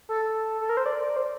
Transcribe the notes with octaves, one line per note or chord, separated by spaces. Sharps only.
A4
A4
A#4
C5
D5
C5